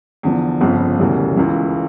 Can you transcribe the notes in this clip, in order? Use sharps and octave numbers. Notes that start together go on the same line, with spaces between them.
E2 D3 F3
G1 F2 C#3 F3
E1 D2 C#3 E3 G3
C#2 C#3 E3